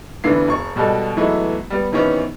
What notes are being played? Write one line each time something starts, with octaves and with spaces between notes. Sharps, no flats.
F1 D3 E3 B3 C7
E1 C#6
B2 G3 G#3 F#4 A4
E3 F#3 G#3 A3 B3 E4
G3 B3
C3 D#3 E3 B3 C#4